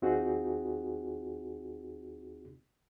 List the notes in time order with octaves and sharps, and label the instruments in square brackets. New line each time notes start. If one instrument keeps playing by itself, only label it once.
[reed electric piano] D#2 C4 D#4 F4 F#4 G#4